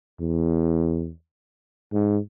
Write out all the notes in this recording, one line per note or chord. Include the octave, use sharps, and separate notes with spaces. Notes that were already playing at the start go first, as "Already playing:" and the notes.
E2
G#2